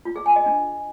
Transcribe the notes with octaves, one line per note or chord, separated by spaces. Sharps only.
F4
G#4
G#5
D#5
D4